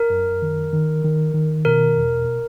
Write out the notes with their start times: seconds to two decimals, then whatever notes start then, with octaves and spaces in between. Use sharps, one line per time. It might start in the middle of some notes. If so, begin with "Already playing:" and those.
Already playing: A#4
0.10 F#2
0.42 D#3
0.73 D#3
1.04 D#3
1.34 D#3
1.65 B2 A#4
1.96 E2